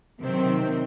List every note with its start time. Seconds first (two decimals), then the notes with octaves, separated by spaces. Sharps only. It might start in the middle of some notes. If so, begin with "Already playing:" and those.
0.20 C3 D#3 F#3 C4